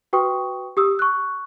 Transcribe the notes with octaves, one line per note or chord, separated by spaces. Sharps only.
F#4 B4 G5 C#6 D#6
G4 D#6 E6
C#6 F#6